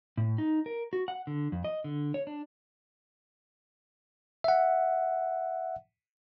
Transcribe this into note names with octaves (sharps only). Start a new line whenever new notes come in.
A2
D#4
A#4
F#4
F#5
D3
F2
D#5
D3
C#5
D4
E5 F#5